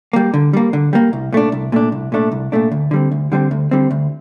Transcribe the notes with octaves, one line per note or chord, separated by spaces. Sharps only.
G3 A#3
D3
G3 A#3
D3
G3 A#3
C2
A#2 A3 D4
C2
A#2 A3 D4
C2
A#2 A3 D4
C2
A#2 A3 D4
D2
D3 G3 C4
D2
D3 G3 C4
D2
D3 G3 C4
D2